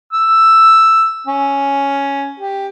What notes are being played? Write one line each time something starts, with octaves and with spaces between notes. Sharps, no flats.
E6
C#4
G4